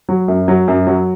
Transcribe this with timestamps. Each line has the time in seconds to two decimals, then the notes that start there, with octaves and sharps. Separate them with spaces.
0.09 F#3
0.28 F#2
0.48 F#3
0.68 F#2
0.87 F#3